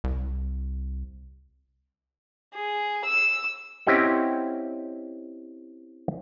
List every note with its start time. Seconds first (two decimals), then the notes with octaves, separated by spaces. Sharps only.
0.04 C2
2.54 G#4
3.04 E6
3.87 C4 C#4 E4 G4 D#5 F#5